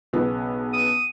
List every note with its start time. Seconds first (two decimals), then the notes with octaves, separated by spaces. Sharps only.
0.13 B1 C#3 B3
0.73 D#6